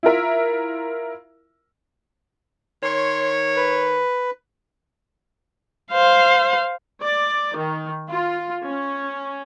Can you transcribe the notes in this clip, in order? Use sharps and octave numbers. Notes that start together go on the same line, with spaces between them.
E4 F4 A#4 E5
D#3 C#5 C6
B4
C5 F5
D5
D#3
F4
C#4